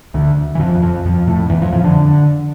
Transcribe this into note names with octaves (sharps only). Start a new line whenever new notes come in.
D2 D3
E3
F2 F3
F2 F3
F2 F3
A2 A3
E2 E3
F2 F3
F2 F3
D3 D4